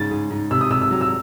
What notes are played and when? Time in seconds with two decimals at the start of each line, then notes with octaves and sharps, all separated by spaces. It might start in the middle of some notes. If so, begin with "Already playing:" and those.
Already playing: G#2 C#3 A6
0.11 G#2
0.31 G#2
0.51 C3 E6
0.61 D#6
0.71 C3 E6
0.81 E6
0.91 F#3
1.01 E6